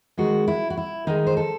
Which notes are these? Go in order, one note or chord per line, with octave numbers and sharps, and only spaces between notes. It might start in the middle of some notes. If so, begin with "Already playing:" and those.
D#3 G#3 F#4
E4
F#4
E4
D#3 G#3 D#4
C5
A4